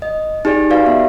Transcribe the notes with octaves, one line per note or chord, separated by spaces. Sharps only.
D#5
D#4 G4 G#4 D5 G#5
F#4 G4 B4 D5 F5
B3 E5